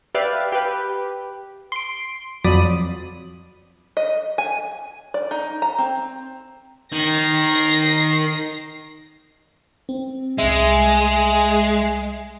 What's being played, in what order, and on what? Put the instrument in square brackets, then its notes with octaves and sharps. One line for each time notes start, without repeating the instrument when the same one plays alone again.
[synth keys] G4 B4 D5 E5 F5
G4 B4
C6 D7
F2 F#3 D5 B5 D#6 D#7
[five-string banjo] D#5
G#5
D5
D#4
A#5
C4
[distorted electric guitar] D#3 [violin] A#6 C7
[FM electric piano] C4
[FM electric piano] C2 E5 [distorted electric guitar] G#3